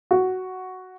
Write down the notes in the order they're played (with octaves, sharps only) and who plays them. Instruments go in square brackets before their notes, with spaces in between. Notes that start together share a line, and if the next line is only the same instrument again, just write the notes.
[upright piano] F#4